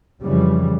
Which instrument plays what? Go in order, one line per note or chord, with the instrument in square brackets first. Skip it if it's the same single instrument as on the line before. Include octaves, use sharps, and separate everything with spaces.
[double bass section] F2 C#3 E3 G3